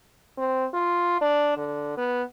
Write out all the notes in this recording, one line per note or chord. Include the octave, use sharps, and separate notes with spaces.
C4
F4
D4
D3
B3